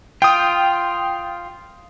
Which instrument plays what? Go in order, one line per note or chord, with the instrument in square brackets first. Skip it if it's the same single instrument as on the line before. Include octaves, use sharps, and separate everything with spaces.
[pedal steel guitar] F4 [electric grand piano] G5 D#6